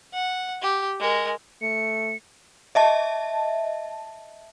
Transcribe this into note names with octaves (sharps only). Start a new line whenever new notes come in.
F#5
G4
G#3 A#4
A3 C#7
D#5 E5 A5